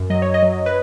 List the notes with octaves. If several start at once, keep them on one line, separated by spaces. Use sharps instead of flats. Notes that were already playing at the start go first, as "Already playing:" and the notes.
Already playing: F#2
F#3 D#5
F#3 C#5
D#5
F#3
B4